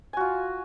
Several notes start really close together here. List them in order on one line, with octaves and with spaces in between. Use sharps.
G#5 F#4 F4